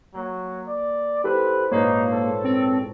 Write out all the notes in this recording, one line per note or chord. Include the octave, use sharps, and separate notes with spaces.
F#3 A#3
D5
E4 G4 A4 B4 C5
A#1 G#2 A#3 D#4 B4 C#5 C7
A4 C5
C4